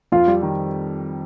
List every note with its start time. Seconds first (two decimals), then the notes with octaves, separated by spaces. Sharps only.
0.12 F2 F4
0.27 G3
0.42 D#3